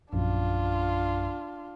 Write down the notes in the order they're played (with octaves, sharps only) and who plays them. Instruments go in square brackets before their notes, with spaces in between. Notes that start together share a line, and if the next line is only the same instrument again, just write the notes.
[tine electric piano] A#1 F#2 [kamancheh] D4 F4